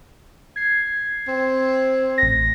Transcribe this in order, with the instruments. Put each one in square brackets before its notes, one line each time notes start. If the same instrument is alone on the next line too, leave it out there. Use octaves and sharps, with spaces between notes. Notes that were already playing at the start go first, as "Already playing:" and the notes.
[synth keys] G#6 C7
[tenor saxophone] C4
[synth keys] A1 A#6